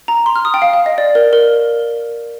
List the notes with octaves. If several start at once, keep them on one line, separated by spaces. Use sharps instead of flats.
A#5
C6
F6
D#6
G5
F5
F5
D#5
D5
A#4
A#4